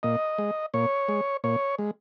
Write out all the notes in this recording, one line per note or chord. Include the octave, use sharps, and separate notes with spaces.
A#2 D#5
G#3
A#2 C#5
G#3
A#2 C#5
G#3